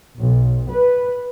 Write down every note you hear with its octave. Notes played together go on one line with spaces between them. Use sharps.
B1
B4